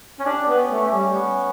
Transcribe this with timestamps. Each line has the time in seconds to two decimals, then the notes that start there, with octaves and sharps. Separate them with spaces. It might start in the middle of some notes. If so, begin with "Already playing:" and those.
0.20 C#4
0.26 D4 G4
0.48 B3
0.56 C#4
0.71 A3
0.85 C#4
0.93 G3
1.14 B3